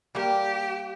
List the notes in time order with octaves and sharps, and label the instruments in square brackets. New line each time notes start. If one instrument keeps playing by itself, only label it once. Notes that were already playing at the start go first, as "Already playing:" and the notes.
[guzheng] G3 A#3 [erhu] G4